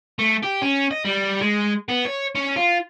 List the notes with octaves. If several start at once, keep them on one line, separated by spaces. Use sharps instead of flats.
A3
G4
C#4
D#5
G3
G#3
B3
C#5
C#4
F4